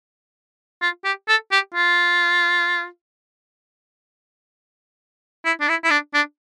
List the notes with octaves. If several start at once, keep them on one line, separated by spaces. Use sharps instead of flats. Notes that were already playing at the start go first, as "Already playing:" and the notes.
F4
G4
A4
G4
F4
E4
D4
E4
E4
D4
D4